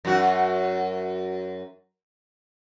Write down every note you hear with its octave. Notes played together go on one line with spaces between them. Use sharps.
F#2 F#4